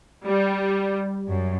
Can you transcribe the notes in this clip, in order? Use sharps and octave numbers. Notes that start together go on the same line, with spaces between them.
G3
F#2